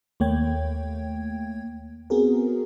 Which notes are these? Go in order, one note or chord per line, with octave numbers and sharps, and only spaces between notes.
D#2 A3 A#3 C#5 G5 G#6
B3 C4 F#4 G#4 A#4